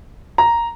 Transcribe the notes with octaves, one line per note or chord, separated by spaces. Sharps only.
A#5